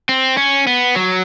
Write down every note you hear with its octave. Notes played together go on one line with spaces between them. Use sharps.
C4
C#4
B3
F#3